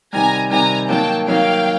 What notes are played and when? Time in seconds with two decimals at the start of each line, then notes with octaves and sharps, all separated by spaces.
0.13 C3 D#3 G3 G#5 A#5
0.51 C3 D#3 G3 G#5 A#5
0.89 D#3 F#3 A#3 G5 A5
1.27 D#3 F#3 A#3 F5 G5